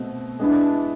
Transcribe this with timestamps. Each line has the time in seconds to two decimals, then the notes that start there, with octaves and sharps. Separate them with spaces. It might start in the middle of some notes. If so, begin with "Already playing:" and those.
Already playing: B2 A3 C4
0.40 G#3 B3 D4 E4